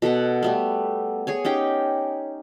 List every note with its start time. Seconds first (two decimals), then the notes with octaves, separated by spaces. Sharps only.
0.02 B2 A4 B4 F#5
0.43 G3 A3 B3
1.27 G#4 C#5 G#5
1.45 C#4 D#4 G4 G5